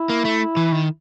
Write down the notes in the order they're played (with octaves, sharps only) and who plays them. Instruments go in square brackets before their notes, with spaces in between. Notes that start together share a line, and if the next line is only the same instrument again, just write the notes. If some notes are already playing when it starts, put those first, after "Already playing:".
Already playing: [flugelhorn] E4
[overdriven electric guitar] A#3
A3
E3
D#3